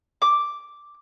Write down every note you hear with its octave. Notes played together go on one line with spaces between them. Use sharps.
D6